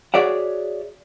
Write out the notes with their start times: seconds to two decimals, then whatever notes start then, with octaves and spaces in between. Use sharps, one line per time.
0.14 F#4 G#4 C#5 D5 E5 F#5